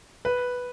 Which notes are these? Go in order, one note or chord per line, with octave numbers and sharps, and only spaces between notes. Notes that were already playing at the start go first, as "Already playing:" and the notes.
B4